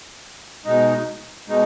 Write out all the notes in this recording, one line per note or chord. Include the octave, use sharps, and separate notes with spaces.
B2 G#3 D#4
B2 G#3 D#4